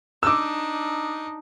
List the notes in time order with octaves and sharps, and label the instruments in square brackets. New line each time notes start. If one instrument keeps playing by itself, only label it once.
[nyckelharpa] D4 D#4 [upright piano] D6 E6